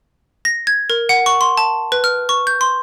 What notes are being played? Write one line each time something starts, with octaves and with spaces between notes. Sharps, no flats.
A#6
G#6
A#4
F#5
C#6
C6
A5
B4
F6
C#6
G6
C6